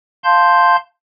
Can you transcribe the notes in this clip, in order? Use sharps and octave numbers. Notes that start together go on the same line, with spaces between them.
F5 A5 C6 G6